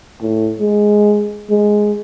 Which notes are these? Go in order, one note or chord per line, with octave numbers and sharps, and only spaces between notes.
A2
G#3
G#3